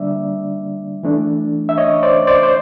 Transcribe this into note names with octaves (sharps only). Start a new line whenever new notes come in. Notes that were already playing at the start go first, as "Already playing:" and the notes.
Already playing: D3 G3 A#3 D4 D5 E5
E3 A3 D4
E5
C#5 D#5
C5 D5
C5 D5
C5